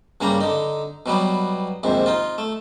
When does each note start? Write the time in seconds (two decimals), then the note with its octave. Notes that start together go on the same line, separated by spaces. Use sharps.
0.21 G2 C#3 G3 A#3 A#5
0.40 D3 D#4
1.06 B2 F#3 G3 B3
1.83 A#1 D#2 G#2 C3
2.06 D#4 F4
2.38 A3